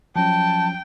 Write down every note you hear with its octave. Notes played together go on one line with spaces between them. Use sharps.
F3 F#3 C#4 G5 A5